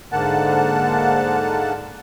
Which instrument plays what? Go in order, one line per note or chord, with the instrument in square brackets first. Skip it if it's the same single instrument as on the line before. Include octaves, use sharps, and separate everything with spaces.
[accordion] G#2 D3 A#3 F#5 A5